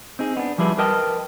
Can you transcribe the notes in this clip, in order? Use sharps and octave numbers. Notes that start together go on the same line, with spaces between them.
C4 D#4 G#4
B3 D4
F3 G3 E4 G#4 B4
A#4 B4 D#5 G5 A5